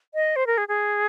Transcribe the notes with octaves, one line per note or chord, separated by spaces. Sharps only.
D#5
C5
A#4
G#4
G#4